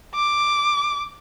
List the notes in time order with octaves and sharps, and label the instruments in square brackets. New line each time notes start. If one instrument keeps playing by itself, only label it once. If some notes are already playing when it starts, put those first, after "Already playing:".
[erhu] D6